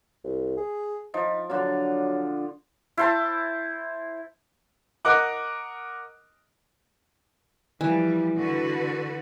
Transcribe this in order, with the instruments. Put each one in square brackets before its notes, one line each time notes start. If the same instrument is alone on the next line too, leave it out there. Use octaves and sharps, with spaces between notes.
[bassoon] C2
G#4
[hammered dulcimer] F3 [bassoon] D#4
[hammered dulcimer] D3 D4 F4 [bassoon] F#3
[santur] E4 C5 A5
[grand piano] A#4 D#5 F#5 D6 F#6
[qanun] E3 [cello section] F3 G3
[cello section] D3 F#4 B4